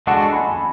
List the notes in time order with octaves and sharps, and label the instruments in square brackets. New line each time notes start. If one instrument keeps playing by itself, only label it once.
[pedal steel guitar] G#3 D4 F#4 A4 [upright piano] F#5 A5
[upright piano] G#5 B5